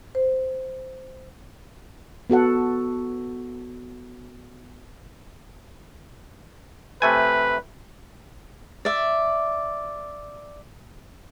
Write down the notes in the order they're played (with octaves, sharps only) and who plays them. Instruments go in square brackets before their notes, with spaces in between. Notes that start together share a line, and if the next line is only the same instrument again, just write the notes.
[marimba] C5
[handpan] B3 F#4 A4 F#5
[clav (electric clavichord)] C3 A3 G#5 [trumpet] B4
[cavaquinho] D5 E5